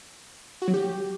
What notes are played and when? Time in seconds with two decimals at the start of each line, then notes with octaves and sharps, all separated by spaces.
0.62 F#4
0.68 F#3
0.74 G4